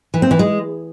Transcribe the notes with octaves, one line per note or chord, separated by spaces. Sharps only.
E3
C4
E3
G#3